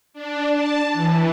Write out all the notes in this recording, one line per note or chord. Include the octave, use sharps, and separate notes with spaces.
D4
A5
E3